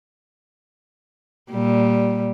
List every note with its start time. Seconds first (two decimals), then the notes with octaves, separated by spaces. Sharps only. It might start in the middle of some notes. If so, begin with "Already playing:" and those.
1.51 A#2 G3